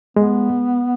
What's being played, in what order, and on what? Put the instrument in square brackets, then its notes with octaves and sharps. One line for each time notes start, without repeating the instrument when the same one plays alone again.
[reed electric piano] G#3 [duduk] B3